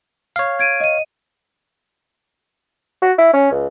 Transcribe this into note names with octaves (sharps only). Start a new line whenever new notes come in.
C#5 F5
G#6 D7 D#7
D#5 D#7
F#4
E4
C#4
C#2